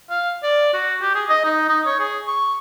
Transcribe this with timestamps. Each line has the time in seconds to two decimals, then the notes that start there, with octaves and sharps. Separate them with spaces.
0.10 F5
0.43 D5
0.74 F#4
1.01 G4
1.15 G#4
1.29 D#5
1.45 D#4
1.69 D#4
1.86 C#5
1.99 G#4
2.27 C#6